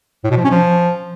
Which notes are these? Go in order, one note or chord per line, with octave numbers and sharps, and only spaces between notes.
A2
B2
F3
C#4
F3